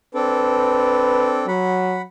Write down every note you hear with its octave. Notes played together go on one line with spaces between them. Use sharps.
C4 D4 A4 B4
F#3 F#5 B5